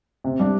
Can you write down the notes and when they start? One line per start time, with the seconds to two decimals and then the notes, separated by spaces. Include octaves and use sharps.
0.24 C3
0.39 G3 D4